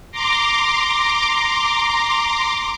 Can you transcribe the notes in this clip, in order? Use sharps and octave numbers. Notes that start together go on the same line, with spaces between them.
A#5 C6 D6